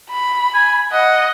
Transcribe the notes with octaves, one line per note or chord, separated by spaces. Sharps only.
B5
G#5
D#5 F#5